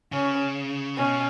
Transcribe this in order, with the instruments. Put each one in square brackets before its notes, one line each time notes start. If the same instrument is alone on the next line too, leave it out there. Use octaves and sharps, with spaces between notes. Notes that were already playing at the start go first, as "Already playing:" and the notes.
[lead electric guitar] C#3 [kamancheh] C#4
[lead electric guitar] B2 [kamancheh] C#4